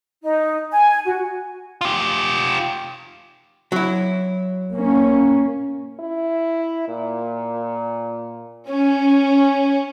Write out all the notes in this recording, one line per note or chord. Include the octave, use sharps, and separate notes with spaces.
D#4
G#5
F#4
F4 G4
F#3 E4
A#3 C#4
E4
A#2
C#4